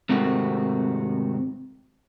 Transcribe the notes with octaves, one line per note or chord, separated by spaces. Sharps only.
G#2 C3 D#3 A3 C4 F#4